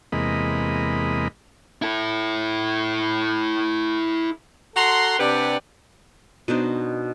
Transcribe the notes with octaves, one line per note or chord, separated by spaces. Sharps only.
E2 C3 G#3 A#3 D#5 B5
E4 A4
F#4 A4 F#5 A#5 C6
C3 D4 G4 B4 D5 F#5
B2 D4 D#4 C5